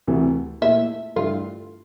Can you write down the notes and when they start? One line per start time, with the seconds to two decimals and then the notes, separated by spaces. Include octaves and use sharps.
0.07 D2 C3 E3 A3
0.62 A#2 A3 E4 A4 E5
1.16 G2 D3 A3 E4 F4